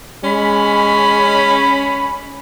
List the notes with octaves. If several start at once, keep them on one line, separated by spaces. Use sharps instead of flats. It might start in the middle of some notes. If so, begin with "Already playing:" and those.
G#3 C#4 B5